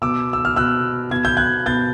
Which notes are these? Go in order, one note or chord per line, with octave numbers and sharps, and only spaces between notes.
B2 D6 E6
E6
F6
B2 E6 F#6
B2 G#6
G6
F#6 G#6
B2 G6 A6